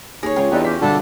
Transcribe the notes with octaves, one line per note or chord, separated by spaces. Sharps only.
D#2 G#4 C#5 A#6
C#2 F4 C#5 G5
E2 D4 D#4 G4 A4 B4
C#4 G4 B6
C2 G2 B2 D3 D4 A4 A5